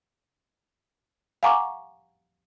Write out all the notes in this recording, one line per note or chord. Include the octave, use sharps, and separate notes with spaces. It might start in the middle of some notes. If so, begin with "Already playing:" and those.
F5 F#5 G#5 A#5 C#6 D6